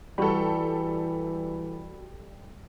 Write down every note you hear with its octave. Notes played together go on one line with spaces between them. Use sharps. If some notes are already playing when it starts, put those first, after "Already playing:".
E3 G3 F#4 A4 B5